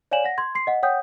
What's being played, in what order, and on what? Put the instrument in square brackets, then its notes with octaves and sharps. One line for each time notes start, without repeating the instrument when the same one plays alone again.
[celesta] C#5 D5 F5 G#5 E7 F#7
F#5 A#6
C6 G#6
C6 C7
D#5 F#5
C#5 F#5 G5 D#6 G6